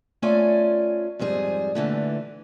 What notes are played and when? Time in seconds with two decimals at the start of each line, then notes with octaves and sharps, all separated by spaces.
0.22 A3 C#4 F4 D5 G#5
1.19 F2 G#2 G3 G#4
1.75 A#2 D3 E3 A3